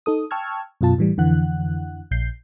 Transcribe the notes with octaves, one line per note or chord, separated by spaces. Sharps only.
D#4 A4 D#6
G5 A5 C#6 E6 F6 G#6
F#2 B2 F4 A5
A2 E3 G3
F2 D3 E3 F#5 F#6
A#1 G6 C7